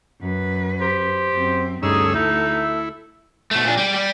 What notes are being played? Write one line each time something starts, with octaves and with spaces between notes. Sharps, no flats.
F#2 B4
G4 C5
F#2 C4
D2 G2 C#4 D#4 G#4 A4 E6
D#4 E4 E5
B2 A3
A#2 D4
G3 G4
G3